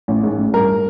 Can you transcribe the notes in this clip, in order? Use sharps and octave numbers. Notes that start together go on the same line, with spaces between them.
A1
G#2
A1
G2 A#4